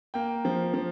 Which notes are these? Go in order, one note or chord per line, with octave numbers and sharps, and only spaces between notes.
A#3 G5
F3
F3